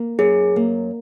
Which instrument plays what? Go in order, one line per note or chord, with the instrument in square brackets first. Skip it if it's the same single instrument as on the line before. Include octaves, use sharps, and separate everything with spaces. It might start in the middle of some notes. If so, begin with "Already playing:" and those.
Already playing: [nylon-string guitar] A#3
[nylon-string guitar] F#2 [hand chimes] G#4
[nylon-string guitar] A#3